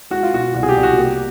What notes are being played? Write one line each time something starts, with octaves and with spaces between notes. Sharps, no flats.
G#3 F#4
F4
B2 F#4
C2 F#4
G#4
G4
C2
F#4
A#3 G4